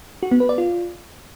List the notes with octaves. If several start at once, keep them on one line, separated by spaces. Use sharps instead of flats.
F#4
B3
B4
D5
F4